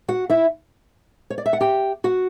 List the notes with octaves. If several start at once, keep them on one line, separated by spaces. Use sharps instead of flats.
F#4 F#5
E4 E5
C#5
D5
E5
F#5
G4 G5
F#4 F#5